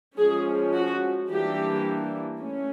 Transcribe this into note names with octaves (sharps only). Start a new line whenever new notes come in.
F3 G#3 C#4 G#4
F#4
E3 G3 A#3 D4 G4
A3 C#4